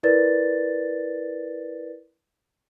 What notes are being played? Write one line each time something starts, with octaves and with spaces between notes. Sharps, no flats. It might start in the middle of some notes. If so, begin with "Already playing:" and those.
E4 A#4 B4 D5 A6